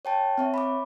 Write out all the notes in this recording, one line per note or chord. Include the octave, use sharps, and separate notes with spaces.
C#5 G5 A5
C4 C#5 E5
B5 D6